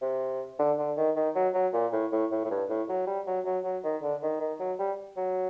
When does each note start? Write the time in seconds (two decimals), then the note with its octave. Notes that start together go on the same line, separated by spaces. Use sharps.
0.02 C3
0.59 D3
0.79 D3
0.97 D#3
1.16 D#3
1.35 F#3
1.54 F#3
1.73 A#2
1.93 A2
2.12 A2
2.31 A2
2.44 A2
2.50 G2
2.69 A2
2.89 F#3
3.07 G3
3.27 F#3
3.45 F#3
3.64 F#3
3.84 D#3
4.03 D3
4.22 D#3
4.41 D#3
4.59 F#3
4.79 G3
5.17 F#3